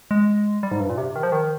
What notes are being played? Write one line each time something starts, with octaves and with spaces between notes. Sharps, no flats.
G#3
G3
G#2
G2
A#2
C3
D#3
F3
D#3